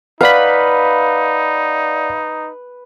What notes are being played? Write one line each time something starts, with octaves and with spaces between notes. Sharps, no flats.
D#4 B4 D5 F5 F#5 B5